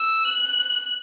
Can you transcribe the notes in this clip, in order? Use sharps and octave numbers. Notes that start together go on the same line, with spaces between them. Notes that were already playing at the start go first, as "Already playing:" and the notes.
Already playing: E6
F#6